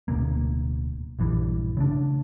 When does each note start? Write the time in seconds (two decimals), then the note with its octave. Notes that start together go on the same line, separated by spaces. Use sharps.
0.08 D1 D2 B2 A#3
1.19 A#1 G2 E3 G3
1.77 C#3 A3 D4